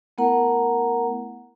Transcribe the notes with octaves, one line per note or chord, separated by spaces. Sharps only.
A3 B3 E4 A#4 F#5 A#5